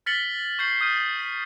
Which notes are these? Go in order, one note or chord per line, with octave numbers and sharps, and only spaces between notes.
F6 A6 B6 C#7 F#7 G7
C#6 G6 C7 F#7
D#6 F6 G6 D#7
B6